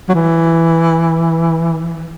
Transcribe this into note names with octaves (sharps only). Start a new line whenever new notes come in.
F#3
E3